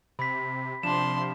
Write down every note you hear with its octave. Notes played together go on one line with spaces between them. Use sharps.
C3 B5 B6
C3 F3 D4 C6 E7